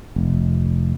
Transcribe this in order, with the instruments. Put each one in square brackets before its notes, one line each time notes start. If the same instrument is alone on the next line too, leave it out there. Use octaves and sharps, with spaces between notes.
[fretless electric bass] F1